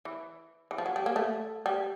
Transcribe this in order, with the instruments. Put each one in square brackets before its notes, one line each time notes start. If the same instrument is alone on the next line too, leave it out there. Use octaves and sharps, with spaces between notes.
[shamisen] E3
E3
F3
F#3
G3
A#3
A3
G3